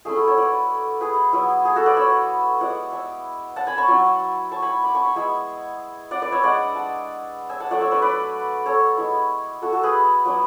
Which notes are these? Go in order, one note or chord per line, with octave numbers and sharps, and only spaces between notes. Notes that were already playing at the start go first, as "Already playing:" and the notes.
A3 C#4 E4 G#4
F#4 A4
A4 C#5
B4 D5
G#4 B4
F#3 B3 E4
G#4
F#4 A4
B4 D5
C#5 E5
G#3 B3 E4 D5 F#5
E5 G#5
F#5 A5
G#5 B5
A5 C#6
F#3 C#4 E4
A5 C#6
G#5 B5
B5 D6
A5 C#6
G#5 B5
G#3 B3 E4 E5 G#5
D5 F#5
B4 D5
C#5 E5
G#3 D4 D5 F#5
F#5 A5
E5 G#5
F#5 A5
F#3 A3 D4 D5 F#5
C#5 E5
B4 D5
B4 D5
A4 C#5
G#3 B3 E4
F#4 A4
F#4 A4
G#4 B4
F#3 B3 D4